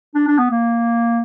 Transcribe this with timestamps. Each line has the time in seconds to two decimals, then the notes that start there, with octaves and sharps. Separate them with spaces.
0.15 D4
0.28 D4
0.39 B3
0.51 A#3